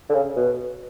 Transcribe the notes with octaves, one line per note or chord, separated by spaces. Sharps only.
D3
C#3
B2